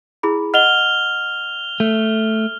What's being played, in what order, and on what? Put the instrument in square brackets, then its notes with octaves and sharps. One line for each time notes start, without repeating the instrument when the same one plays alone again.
[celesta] E4 G#4 B5
[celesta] D#5 F#5 [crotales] F6 F7 G7
[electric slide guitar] A3